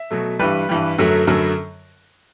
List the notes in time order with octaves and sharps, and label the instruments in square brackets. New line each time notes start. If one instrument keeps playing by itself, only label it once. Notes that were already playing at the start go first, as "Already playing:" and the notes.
Already playing: [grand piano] E5
B2 F#3 A3
G2 E3 G3 B4
G2 E3 G3
F#2 D3 F#3 A3
F#2 D3 F#3 A3